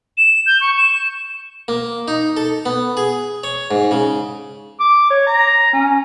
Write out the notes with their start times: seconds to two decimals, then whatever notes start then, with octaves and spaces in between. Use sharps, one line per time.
0.18 E7
0.46 G6
0.61 C#6
0.77 E7
1.68 A#3
2.08 D#4
2.37 A4
2.66 B3
2.97 G#4
3.44 C#5
3.71 G#2
3.91 C#3
4.80 D6
5.10 C#5
5.27 A#5
5.73 C#4